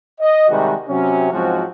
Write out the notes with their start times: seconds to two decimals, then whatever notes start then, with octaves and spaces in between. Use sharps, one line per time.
0.21 D#5
0.49 C3 D#3 G3 G#3 F#4
0.89 C3 F#3 C#4
1.32 G#2 F3 F#3 G#3 C4 F#4